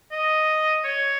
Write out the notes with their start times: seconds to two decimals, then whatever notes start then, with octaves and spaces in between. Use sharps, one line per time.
0.11 D#5
0.84 C#5